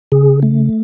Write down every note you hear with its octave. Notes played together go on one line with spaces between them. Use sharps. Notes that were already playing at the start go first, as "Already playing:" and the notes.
C#3 G#4
A3